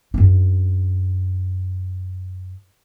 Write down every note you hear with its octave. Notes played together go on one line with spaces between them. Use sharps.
F#2 D4